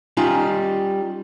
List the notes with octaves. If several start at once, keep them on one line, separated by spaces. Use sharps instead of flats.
G3 C#4 D#4 F4